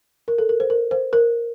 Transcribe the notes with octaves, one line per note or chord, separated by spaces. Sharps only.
A#4
A4
A#4
C5
A#4
C5
A#4